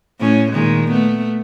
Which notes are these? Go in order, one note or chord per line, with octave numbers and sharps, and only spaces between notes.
A2 C#4
A#2 D#3 G#3
A3 B3